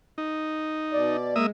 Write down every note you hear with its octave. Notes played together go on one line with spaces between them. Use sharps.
D#4
B2 D5
G#3 A#3 E5 D#6